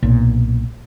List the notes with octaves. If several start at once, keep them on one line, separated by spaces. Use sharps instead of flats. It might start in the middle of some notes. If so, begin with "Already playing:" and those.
B1 A#2